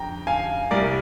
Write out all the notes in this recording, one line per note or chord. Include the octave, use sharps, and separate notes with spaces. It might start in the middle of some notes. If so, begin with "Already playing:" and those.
Already playing: F2 D3 G5 A#5
F5 G#5
C2 C3 G3 A#4 D5